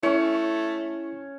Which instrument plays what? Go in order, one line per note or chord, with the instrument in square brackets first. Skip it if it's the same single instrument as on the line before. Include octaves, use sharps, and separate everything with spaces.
[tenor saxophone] A3 [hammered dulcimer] C#4 C#5 [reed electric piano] E4